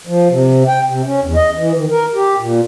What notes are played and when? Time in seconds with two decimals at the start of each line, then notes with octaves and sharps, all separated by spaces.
0.07 F3
0.30 C3
0.68 G5
0.88 C3
1.05 C#4
1.22 E2
1.36 D#5
1.57 E3
1.76 D#3
1.90 A#4
2.15 G4
2.40 A#2